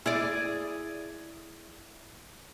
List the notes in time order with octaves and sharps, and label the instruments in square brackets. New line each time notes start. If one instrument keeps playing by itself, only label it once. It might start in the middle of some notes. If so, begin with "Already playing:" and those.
[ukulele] E4 [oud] G#4 D5